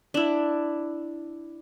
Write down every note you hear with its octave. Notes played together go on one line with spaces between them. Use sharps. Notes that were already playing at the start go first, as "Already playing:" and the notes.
D4 E4